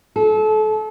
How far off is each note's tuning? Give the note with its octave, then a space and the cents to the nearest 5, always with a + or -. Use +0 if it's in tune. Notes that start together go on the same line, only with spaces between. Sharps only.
A4 -30